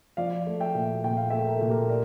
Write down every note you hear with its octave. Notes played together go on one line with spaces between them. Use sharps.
F3 D5 F5
A3
E5 G5
A#2
A#2 G5
F5
A3 E5 G5
A#4
A#2 A4
G4 A#4
A#4 D5